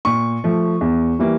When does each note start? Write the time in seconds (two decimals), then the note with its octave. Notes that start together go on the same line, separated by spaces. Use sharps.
0.05 A#2 C#6
0.44 F3 A3
0.81 E2
1.19 E3 G3 A#3